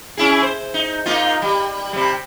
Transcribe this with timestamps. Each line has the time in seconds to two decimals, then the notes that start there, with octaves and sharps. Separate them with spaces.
0.17 C#4 E4 G#4
0.43 C5
0.74 D#4
1.06 A#3 D#4 F4
1.42 G3
1.93 C3 G3